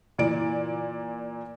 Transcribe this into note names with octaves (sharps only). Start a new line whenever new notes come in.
A#2 E3 D5 D7